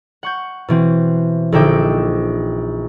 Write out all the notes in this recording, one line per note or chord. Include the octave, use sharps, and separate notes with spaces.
F#5 C#6 G6
B2 E3 C4
A#1 D3 D#4 E5 G5 D6